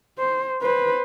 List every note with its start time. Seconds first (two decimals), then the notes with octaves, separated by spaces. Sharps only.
0.19 C5
0.62 B4 C5